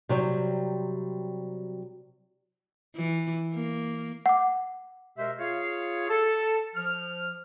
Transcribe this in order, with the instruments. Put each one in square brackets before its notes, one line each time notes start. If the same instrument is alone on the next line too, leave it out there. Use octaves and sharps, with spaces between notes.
[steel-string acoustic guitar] C3 F#3 G3
[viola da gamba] E3
A#3
[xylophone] F#5 D6
[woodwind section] B2 G#3 G4 A#4 C5 E5
F4 G#4 C#5 F5
A4
F3 F6